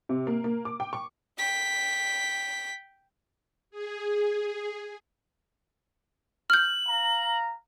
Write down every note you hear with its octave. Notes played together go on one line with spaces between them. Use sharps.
C3
A#3
A#3
D6
G5
C#6
G5 B6
G#4
F6 G6 F#7
F5 A#5